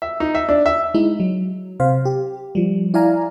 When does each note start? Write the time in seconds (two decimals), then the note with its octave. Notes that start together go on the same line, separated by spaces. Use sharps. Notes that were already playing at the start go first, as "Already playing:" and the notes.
0.02 E5
0.20 D#4
0.35 E5
0.49 D4
0.66 E5
0.94 G#3 D#4 E4
1.20 F#3
1.80 C3 C5 F5
2.05 G4
2.55 F3 G3
2.94 E4 D5 F5 G#5 A#5